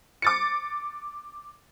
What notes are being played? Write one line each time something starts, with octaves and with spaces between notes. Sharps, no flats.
D6 A6 C#7